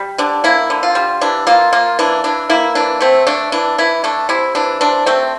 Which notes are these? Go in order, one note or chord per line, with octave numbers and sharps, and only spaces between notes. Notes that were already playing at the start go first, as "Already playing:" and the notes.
Already playing: G3
D3 D4
A#3 E4
D3
F4
G3
E3 D4
A#3 F4
A#3 F4
E3 D4
E3 D4
A#3 E4
E3 D4
A3 C4
A3 D4
E3 D4
E3 E4
A3 D4
C3 E4
E3 D4
C3 D4
A3 C4